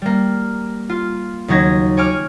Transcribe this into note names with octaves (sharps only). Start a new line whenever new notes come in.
G3 A#3
F4
D#2 C#3 F#3 D#4 G#6 A#6
C#5 G#5 D6 F6